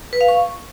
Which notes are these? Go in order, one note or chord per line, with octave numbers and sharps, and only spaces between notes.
B4
F5
C#6